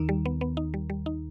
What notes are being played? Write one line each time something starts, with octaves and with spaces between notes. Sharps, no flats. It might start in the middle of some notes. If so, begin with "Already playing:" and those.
Already playing: D#2 D#3 D#4
G3
B3
B3
D#4
G3
G3
D#4